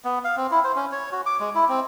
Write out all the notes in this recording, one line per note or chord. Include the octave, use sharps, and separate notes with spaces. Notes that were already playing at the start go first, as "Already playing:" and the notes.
B3
F5
C4
E4
C5
C#4
C#5
F#4
D6
G#3
E4
C4